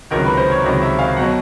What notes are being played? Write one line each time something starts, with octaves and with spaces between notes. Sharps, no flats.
C#2 C3 D#3 F#3 A#4
B4
C5
C#5
C#2 C3 D#3 F#3
E5
F5
B2 F#3 F#5